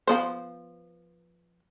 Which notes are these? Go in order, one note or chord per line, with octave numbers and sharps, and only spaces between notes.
F3 B3 C5